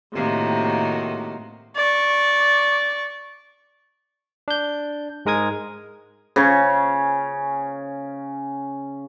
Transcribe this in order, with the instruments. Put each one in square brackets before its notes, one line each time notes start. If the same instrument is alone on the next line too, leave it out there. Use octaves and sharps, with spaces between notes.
[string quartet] A2 C3 [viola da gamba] D#3 A#3 F#4
[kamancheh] D5 C#6
[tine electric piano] D4 G6
G#2 G#3 A#4 D#6 G#6
[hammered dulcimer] C#3 C#4